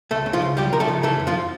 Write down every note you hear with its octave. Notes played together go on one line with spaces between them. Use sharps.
C#2 A3 A4
C#3
F3 F4
C#2
F3 G3 G4
F3 A#4
A3 A4
C#3
E3 A3 A4
F2
F3 F4